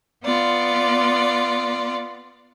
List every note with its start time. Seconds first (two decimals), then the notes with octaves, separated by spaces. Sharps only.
0.24 B3 F4 D5